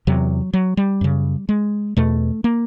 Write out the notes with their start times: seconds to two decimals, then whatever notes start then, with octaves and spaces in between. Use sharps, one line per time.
0.07 E2 C3 F#3
0.54 F#3
0.77 G3
1.01 F#2 C#3
1.49 G#3
1.97 E2 B2 A3
2.44 A#3